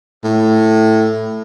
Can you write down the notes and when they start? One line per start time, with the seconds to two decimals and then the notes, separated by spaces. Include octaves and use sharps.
0.24 A2